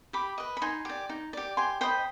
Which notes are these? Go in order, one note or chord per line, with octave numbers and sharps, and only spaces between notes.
G4 B5 D6
B4 D#5
B5
D#4 G#5 C6
G4 D5
D#4
G4 D5
G4 G#5 C6
C5 D#5 G5 B5